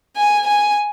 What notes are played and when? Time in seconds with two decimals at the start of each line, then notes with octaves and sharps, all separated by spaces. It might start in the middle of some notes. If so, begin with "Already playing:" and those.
0.16 G#5
0.47 G#5